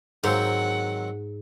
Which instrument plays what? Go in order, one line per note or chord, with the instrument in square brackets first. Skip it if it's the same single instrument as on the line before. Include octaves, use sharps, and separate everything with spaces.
[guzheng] G#2 [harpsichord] D#3 F#3 C4 [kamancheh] F#5